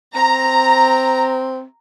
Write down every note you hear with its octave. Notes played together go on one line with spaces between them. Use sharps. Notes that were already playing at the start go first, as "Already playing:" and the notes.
C4 A#5